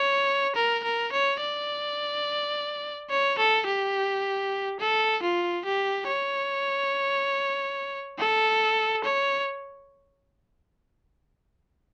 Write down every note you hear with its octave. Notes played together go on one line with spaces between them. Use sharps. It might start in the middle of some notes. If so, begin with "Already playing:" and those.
Already playing: C#5
A#4
A#4
C#5
D5
C#5
A4
G4
A4
F4
G4
C#5
A4
C#5